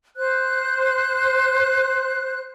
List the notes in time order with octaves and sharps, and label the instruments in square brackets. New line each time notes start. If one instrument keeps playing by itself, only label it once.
[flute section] C5 F#6